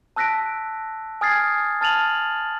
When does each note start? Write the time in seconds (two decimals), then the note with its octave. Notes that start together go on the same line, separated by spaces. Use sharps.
0.16 A5 E6 F#6 A#6 B6 D7
1.21 G#5 D#6 F6 G#6 A6 C7
1.81 A5 F6 A6 D#7 F7 F#7